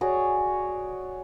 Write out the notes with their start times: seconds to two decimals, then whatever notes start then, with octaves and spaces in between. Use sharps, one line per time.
0.01 F#4 G#4 C#5 D5